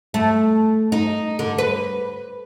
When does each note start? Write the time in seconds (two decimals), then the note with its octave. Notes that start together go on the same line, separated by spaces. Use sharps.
0.14 A3
0.92 D#4
1.39 D3
1.58 B4